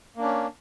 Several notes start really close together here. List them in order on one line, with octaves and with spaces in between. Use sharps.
A#3 D4 C#4